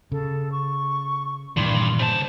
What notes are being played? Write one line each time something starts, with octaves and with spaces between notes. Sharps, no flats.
C#3 A4
C#6
G2 A#2 D#3 E3 C6
C#3 C5 A5